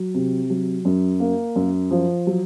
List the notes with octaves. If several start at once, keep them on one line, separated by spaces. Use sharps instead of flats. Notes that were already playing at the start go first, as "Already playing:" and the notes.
Already playing: F#3
C3
F#3
F#2
A#3
F#2
F3
F#3